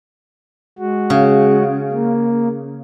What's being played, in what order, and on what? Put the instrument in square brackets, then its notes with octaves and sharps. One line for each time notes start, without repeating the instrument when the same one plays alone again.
[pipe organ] G#3 F#4
[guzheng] C#3
[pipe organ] A#3